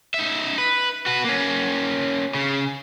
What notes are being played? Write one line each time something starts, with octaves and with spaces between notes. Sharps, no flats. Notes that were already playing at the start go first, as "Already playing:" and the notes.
D#4 E5
B4
F#4 B4
A#3 C#4
C#3